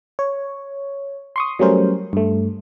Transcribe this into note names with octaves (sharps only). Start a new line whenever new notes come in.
C#5
C6 C#6 D#6
F#3 G3 A3 C#4 A#4 C5
G2 A3